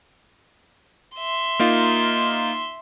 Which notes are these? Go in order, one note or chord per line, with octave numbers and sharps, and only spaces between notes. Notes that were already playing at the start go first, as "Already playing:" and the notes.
E5 C6
A#3 D#4 F4